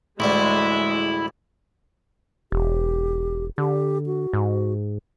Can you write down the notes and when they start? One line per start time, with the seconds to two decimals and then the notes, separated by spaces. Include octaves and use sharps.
0.20 A1 D2 G3 G#3 E4
2.52 E1 G4
3.58 D3 G4
4.06 F#4
4.33 G#2